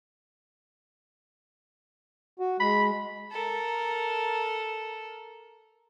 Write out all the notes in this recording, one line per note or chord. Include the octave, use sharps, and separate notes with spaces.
F#4
G#3 B5
A4 A#4